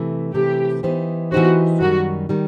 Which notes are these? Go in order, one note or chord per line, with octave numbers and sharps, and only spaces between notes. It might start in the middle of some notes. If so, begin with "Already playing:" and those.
Already playing: C3 E3 A3
C3 E3 A3 G4
E3 B3 D#4 G4 C5
E3 B3 D#4 F#4 G4 C5
F#2 D#3 G3 F#4
D#3 G3